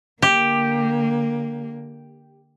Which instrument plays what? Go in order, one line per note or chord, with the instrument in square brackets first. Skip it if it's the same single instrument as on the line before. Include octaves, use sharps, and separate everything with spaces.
[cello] D3 A#3 [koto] G4